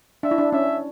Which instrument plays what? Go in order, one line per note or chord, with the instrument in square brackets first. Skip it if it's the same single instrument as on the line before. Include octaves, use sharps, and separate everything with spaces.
[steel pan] D4 [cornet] E5
[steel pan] E4
D4
[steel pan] C#4 [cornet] E5